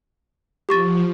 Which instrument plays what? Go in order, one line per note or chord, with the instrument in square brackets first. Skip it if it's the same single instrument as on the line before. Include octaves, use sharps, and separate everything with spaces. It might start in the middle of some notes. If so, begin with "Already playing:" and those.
[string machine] F3 [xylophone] G4 C#6 A6